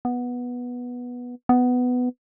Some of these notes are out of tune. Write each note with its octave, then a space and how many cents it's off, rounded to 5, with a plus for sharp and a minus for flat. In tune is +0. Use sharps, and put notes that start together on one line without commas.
B3 -10
B3 +10